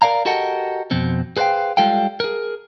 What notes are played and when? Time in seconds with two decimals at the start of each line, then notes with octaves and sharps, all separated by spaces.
0.02 A#4 D5 F5 A#5
0.26 F#4 G4 A4 A#4 D#5 F#5
0.91 F2 B2 C4
1.37 G#4 B4 C5 D5 F5 G5
1.77 G3 G#3 F4 A4 F5 G5
2.20 G#4 A#4